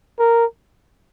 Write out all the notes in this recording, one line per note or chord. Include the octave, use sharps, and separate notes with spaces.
A#4